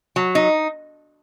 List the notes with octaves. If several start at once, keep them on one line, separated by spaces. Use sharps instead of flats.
F#3
D#4